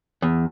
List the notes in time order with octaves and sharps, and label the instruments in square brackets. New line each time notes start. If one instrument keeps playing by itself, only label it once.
[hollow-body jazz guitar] E2